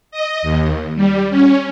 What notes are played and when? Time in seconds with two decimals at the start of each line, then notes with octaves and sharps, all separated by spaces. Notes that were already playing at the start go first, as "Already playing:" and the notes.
0.11 D#5
0.43 D#2
0.96 G3
1.30 C#4